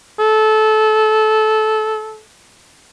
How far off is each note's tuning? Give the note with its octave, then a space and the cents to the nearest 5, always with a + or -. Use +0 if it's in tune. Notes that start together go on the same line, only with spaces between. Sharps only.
A4 -20